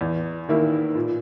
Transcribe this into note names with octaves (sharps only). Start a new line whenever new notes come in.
E2
D#3 A#3 E4
A#2